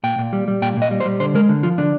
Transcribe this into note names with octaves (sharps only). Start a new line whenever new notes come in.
A#2 G5
A#2
G3
G3
A#2 G5
A#2 D#5
G3
C5
G3
D3 C5
G#3 A#4
D3
F3 F4
D3 D4